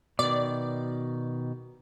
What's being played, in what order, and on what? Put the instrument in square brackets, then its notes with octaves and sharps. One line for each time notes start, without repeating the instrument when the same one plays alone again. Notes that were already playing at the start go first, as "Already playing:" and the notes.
[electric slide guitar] B2 D#3 [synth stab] D5